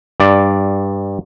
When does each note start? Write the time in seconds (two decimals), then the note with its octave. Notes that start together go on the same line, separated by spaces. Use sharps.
0.20 G2 D5